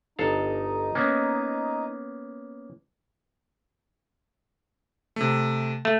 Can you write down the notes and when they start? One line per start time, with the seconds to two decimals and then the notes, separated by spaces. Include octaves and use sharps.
0.19 G1 D#4 A4 F5
0.95 A#3 B3 C#4
5.16 C3 A3
5.85 A3